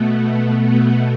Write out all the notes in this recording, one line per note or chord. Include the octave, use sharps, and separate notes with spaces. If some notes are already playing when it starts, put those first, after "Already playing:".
Already playing: B2 A3 B3
B2 A3 B3